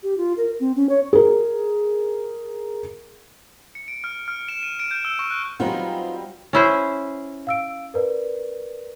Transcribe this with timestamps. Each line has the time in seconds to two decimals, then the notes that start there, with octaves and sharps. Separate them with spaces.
0.03 G4
0.17 F4
0.37 A#4
0.60 C4
0.76 C#4
0.89 C#5
1.13 G#4 A#4
3.75 C#7
3.88 D7
4.04 F6
4.28 F6
4.48 E7
4.63 D#7
4.80 D7
4.91 G6
5.05 E6
5.19 C#6
5.31 F#6
5.60 F#3 G3 B3 C4 D#4 F4
6.53 C#4 E4 C5
7.47 F5 E6 D7
7.94 A#4 B4 D5